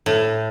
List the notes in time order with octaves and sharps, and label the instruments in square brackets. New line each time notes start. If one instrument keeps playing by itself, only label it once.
[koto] A2